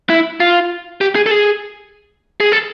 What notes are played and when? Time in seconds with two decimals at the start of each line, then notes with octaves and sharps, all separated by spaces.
0.10 E4
0.40 F4
1.01 G4
1.15 G#4
1.26 A4
1.31 G#4
2.40 G#4
2.52 A4